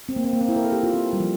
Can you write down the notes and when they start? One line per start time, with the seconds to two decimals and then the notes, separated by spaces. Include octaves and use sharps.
0.09 C4
0.16 A#3
0.24 C4
0.33 A#3
0.41 C4
0.48 E4
0.56 A#4
0.65 A4
0.72 G4
0.83 F4
0.94 C4
1.13 G3
1.20 F3